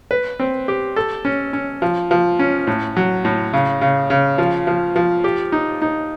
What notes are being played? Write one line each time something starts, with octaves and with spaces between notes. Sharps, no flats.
B4
C4
G4
A4
C#4
C#4
F3
F3
C#4
A2
F#3
A2
C#3
C#3
C#3
F3
F3
F3
G4
D#4
D#4